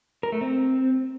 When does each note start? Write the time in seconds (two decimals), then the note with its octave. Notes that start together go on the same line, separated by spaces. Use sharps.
0.23 A#4
0.32 A3
0.41 C4